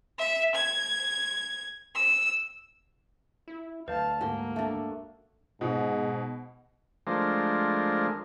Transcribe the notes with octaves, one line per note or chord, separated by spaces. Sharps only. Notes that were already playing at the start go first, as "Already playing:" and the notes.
E5
G#6
E6
E4
D2 F#3 B4 F5 A5 G6
G#2 F#3 G#3 A#3 C6
A3 D4
G#2 B2
F3 G#3 A3 D4 A#4 C5